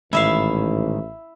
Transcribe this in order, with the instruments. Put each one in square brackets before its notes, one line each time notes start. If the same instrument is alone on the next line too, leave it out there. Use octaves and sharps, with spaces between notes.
[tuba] A1 [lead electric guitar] G#2 D#3 [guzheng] E4 E5 F5